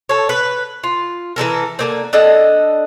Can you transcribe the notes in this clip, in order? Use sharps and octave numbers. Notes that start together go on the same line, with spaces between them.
A4 C#5
B4
F4
E3 G3 A4 A#4
D3 A#3 C4
D4 A4 D#5 F#5